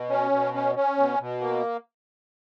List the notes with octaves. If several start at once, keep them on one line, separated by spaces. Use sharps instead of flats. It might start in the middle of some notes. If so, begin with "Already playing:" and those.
Already playing: B2
C#4
B2
C#4
C#4
B2
B2
A#3